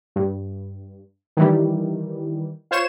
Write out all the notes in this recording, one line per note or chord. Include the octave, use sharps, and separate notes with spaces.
G2
D#3 E3 G3
F4 C5 C#5 E7